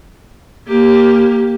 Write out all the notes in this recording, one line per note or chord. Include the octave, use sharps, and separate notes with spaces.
A#3 G4